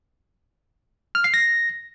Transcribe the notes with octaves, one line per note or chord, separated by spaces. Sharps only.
F6
C7
A#6